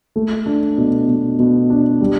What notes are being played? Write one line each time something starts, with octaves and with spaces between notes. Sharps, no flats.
A3
D4
B2
B2
B2
D4
G3